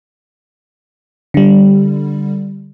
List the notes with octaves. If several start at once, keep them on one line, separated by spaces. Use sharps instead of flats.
D3 G3